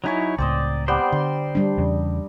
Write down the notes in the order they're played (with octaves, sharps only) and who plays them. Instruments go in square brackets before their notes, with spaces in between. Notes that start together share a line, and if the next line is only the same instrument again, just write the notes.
[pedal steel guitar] F#3 D#4 E4 [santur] C#5 G#5 A#5
[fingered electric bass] C#2 A2 [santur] C4 C5 D#5 [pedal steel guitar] D5
[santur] G3 B3 G4 [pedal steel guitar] C5 D5 G5
[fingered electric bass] D3 [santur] C6
[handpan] G3 D4
[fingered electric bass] E2 C#3